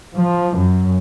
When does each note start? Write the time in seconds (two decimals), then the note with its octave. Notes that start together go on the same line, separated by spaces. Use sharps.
0.16 F3
0.57 F#2